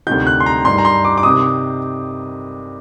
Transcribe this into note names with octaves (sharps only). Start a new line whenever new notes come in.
D2 C3 D#3 G6
F#6
C6
A#5
G2 D#3 C6
A#5
C6
D6
D6
C3 D#3 D#6